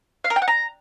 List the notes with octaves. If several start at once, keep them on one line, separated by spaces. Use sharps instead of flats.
F5
A#4
G5
F#5
A#5